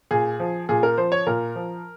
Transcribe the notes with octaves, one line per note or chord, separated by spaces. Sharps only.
A#2 G#4
F3
A#2 G#4
A#4
F3 C5
C#5
A#2 A#4
F3